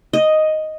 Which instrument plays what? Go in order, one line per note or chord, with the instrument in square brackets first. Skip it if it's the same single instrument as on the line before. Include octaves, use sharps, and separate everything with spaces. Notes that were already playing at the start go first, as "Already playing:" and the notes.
[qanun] D#5